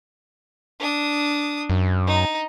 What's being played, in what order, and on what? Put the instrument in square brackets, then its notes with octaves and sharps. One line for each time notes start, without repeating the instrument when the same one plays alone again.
[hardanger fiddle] D4 D#6
[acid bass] F#2
[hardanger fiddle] D#4